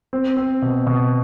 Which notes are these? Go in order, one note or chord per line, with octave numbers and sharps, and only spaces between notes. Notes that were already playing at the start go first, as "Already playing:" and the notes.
C4
C4
B2
B2